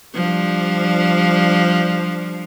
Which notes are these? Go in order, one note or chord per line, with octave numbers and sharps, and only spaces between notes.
F3 G3 D4